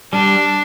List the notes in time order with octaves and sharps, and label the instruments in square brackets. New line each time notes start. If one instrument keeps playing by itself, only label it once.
[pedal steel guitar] G3 [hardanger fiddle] D4